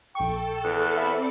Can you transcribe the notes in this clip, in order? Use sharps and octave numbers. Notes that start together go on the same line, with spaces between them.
A#1 A4 G5 C#6
E2 F#6
C4 D5 E5 B5 C#7